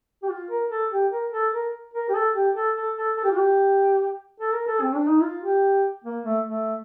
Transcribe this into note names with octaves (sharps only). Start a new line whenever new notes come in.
G4
F4
A#4
A4
G4
A#4
A4
A#4
A#4
G4
A4
G4
A4
A4
A4
A4
G4
F4
G4
A4
A#4
A4
C4
D4
D#4
F4
G4
A#3
A3
A3